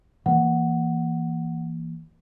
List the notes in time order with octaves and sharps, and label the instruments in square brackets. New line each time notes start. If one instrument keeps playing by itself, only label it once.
[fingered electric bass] E3 A#3 [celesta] F#5